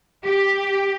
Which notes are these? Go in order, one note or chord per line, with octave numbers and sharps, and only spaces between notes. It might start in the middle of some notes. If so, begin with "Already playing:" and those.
G4